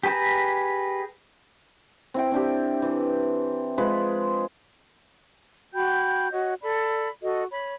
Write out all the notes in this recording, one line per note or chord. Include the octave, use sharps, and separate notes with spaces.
G4 G#4 B4 A5 A#5
C4 E4 G5
C4 D4 G4
E3
F3 G#3 B4
F#4 G5 B5 G6
F#4 C#5 D#5
A4 D5 B5
F#4 A4 D#5
C#5 B5